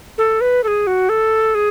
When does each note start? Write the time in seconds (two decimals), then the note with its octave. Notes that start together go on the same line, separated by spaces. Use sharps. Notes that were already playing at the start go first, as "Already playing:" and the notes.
0.18 A4
0.41 B4
0.64 A4
0.68 G#4
0.87 F#4
1.09 A4
1.55 G#4